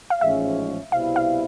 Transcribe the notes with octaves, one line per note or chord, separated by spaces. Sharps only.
F5
A1 G#2 F3 G#3 C#4 E5
C2 B2 G3 C4 E4 F5
F5